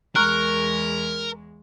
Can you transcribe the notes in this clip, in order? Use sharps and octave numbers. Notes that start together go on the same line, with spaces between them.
E2 G#3 A#4 C#6 F6 F#6